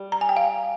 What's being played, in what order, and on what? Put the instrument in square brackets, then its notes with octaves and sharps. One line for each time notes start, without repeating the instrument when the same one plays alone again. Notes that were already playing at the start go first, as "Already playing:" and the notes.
Already playing: [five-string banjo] G3
[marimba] A#5
G#5
G5
F5